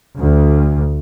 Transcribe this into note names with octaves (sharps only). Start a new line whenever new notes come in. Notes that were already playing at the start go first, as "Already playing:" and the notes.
D2